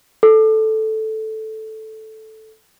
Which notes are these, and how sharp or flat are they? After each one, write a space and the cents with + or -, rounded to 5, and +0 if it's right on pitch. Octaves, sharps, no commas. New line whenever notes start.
A4 -5